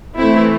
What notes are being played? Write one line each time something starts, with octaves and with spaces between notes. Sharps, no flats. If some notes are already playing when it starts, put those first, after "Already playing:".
E3 A3 C4 E4